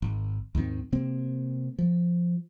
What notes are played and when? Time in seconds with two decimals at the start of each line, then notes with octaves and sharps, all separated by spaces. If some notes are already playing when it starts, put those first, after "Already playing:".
0.02 G#1
0.55 D#2 G#2 D#3 C4
0.92 C3 A#3 C4
1.79 F3